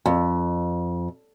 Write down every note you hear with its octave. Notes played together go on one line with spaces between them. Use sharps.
F2